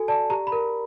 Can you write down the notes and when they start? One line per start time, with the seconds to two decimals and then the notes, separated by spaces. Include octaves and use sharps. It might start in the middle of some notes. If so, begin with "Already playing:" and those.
Already playing: F#4 A4 G#5
0.08 D5 A5
0.30 G4 A#5
0.47 B5
0.52 A#4